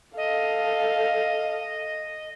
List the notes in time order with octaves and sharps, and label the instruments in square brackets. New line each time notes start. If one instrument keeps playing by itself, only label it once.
[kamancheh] A4 F5 [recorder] D#5